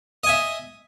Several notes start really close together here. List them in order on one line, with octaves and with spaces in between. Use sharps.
D#5 G#5 E5